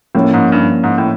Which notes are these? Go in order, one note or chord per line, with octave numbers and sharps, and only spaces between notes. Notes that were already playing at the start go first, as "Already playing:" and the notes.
A2 F3 A#3 C#4 E4
G#2
G2
G#2
A2